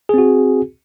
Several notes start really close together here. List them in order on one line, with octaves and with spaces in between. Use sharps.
G#4 C4 F#4